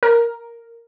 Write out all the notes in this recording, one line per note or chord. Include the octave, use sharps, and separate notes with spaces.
A#4